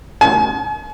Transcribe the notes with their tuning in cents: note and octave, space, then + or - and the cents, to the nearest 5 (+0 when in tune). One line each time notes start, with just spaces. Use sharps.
G#5 +40